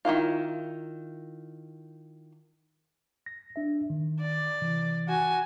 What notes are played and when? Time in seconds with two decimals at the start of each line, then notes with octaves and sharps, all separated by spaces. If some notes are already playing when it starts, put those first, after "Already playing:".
0.05 D#3 F#3 E4 F4
3.26 A#6
3.56 D4 E5
3.90 D#3
4.21 D5
4.62 C3 E3
5.08 F#4 G#5